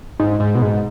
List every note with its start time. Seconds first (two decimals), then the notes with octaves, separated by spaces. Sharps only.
0.19 G#2
0.40 G#2
0.55 B2
0.62 G#2